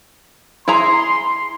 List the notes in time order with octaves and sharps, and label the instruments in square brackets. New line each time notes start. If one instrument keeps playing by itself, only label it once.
[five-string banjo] E4 G#4 A#5 [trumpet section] C6